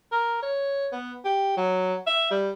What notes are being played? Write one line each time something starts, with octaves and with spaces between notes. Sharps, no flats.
A#4
C#5
B3
G4
F#3
E5
G3